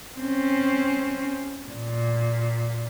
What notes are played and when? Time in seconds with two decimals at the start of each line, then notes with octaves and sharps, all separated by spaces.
0.19 C4 C#4
1.69 A#2